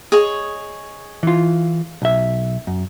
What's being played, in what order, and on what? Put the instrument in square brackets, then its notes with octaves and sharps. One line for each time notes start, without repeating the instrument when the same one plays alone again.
[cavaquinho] G#4 C#5 D#5
[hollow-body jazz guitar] E3 F4
B1 E5
F#2